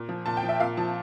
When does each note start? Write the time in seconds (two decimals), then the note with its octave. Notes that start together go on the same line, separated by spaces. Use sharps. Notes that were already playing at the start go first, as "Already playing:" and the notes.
Already playing: A#2
0.09 F3
0.26 A#2 A5
0.37 G5
0.43 F3
0.49 E5
0.60 A#2 F5
0.77 F3 A5